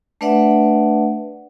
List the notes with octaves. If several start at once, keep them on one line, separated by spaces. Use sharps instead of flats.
A3 D4 B4 D5 E5 F#5